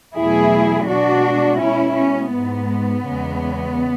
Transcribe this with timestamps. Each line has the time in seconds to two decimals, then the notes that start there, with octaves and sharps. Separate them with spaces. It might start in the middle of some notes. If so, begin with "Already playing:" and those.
0.16 E2 B2 F#3 A3 E4 G#4
0.89 B2 G#3 D4 F#4
1.61 B2 G#3 C#4 E4
1.97 C#4
2.33 G#2 G#3 B3
3.06 E2 C#3 G#3